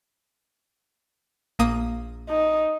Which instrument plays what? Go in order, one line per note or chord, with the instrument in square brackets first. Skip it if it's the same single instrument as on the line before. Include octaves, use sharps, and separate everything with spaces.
[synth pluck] A#1 A#3 D#6
[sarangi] D#4